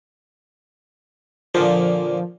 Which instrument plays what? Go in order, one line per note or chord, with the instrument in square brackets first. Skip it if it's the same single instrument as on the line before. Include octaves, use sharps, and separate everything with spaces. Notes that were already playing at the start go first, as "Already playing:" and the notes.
[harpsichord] A#2 D3 A#3 [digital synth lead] F3